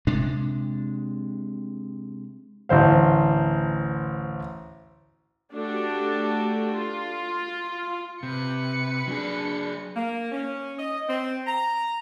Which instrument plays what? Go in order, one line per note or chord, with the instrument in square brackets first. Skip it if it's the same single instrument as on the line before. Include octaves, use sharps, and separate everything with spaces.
[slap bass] C3 G#3 D4
[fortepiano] A1 D2 C5 F5
[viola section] A3 D4 F#4 G4 A4
F4
[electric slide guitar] C3 [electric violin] B4 C#7
[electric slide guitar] F#3 G#4 [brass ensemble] D4
[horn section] A#3
C#4
D#5
C4
A#5